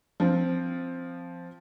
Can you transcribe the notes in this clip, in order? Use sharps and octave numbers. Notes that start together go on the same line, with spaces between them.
F3 C4